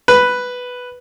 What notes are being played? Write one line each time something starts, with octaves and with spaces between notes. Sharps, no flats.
B4